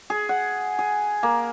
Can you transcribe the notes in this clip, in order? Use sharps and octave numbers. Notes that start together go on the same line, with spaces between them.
G#4
F#5
G#4
A#3